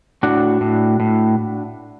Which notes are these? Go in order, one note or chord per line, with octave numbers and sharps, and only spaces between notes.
A2 D4 F#4
A2
A2